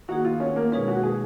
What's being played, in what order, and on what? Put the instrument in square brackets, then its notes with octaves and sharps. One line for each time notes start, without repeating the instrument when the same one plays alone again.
[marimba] D#3 A#3 D#4 G#4 [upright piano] F#4
[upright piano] F4
C#4
A#3
[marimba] B2 G#3 D#4 G#4 B4 [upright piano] C#4
[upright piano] F#4
G#4